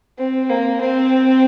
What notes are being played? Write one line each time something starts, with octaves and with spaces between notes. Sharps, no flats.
C4
A#3
C4